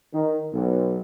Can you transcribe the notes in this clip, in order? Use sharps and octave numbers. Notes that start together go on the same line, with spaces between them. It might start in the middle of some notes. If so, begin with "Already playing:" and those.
D#3
B1